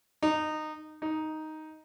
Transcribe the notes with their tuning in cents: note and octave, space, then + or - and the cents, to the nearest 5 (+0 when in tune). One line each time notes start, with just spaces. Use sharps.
D#4 -15
D#4 +5